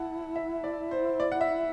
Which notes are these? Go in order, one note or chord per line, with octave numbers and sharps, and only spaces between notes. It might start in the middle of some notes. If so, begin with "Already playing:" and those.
Already playing: E4 F#5 A5
E5
D5
C5
D5
F#5
E5